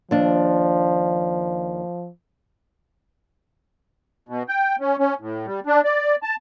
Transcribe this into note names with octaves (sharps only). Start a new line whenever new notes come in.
D#2 F3 D4
B2
G5
C#4
C#4
A2
G3
D4
D5
A5